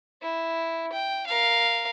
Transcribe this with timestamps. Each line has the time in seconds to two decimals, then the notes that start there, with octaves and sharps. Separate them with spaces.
0.22 E4
0.92 G5
1.26 A#4 F5